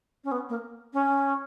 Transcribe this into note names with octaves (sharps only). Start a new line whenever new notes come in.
C#4
B3
A#3
C#4